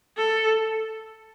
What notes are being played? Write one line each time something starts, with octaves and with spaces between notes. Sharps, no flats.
A4